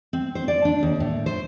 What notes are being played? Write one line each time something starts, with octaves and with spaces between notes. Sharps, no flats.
C4
C5
D5
D4
D#2
A2
C5